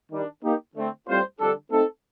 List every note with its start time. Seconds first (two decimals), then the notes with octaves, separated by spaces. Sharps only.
0.12 D#3 G3 D4
0.44 A#3 D#4 G4
0.76 D3 A3 C4
1.09 A2 G3 C4 F4 C5
1.40 F2 D3 G3 D4 A4
1.71 A3 C4 D#4 A4